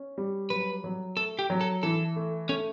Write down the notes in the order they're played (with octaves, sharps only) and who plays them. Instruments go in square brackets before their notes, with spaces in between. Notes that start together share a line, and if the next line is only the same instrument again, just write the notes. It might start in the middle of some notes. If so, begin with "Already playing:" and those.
Already playing: [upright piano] C#4
G3
[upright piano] F#3 [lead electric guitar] B4
[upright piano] F#3
[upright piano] A3 [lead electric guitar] A4
[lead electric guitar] G4
[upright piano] F#3
[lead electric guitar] A4
[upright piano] E3 [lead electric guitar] A4
[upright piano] A3
[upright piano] A3 [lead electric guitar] C#4